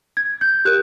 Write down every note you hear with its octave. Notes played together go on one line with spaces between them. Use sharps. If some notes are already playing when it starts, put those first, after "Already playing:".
G#6
G6
G4 A#4 F#6